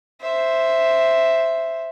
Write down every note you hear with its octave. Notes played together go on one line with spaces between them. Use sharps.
C5 E5